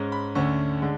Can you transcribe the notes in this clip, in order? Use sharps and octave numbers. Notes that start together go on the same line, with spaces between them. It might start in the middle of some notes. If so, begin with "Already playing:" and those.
Already playing: G#2 G#3 C#4
B5
D2 D3 A3 C#4 C#6
D3 G#3